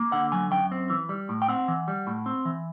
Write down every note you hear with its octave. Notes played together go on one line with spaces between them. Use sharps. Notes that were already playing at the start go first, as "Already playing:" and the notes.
Already playing: A#3
D3 F#5
F#3 G#5
F#2 G5
C4
E3
G3
A2
G5
C4 F#5
E3
G3
A2
C4
E3